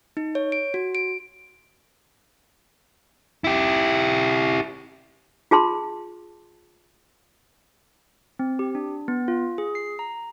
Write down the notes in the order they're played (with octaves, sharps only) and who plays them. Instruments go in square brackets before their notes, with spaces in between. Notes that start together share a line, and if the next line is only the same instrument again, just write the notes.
[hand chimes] D#4
C#5
D7
F#4
D7
[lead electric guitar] E4 G4
[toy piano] F4 G#4 A5 C6
[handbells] C4
G4
D4
B3
F4
G#4
C7
A#5